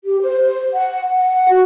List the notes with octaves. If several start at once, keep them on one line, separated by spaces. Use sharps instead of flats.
G4
C5
C5
F#5
F#5
F#4